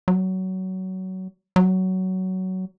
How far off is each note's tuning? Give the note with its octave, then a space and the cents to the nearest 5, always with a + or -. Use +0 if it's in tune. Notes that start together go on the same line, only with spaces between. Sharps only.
F#3 +20
F#3 +15